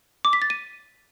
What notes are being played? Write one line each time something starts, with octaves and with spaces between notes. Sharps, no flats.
D6
B6
A6
D#7